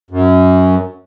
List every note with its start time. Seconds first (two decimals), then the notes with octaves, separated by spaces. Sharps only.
0.11 F#2